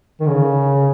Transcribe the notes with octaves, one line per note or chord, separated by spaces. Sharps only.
D#3
C#3